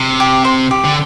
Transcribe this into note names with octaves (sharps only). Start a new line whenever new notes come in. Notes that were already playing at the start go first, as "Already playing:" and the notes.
Already playing: C3
G4
C5
G4
D3